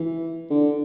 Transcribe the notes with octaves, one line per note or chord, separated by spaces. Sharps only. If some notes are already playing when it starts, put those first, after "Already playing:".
Already playing: E3
D3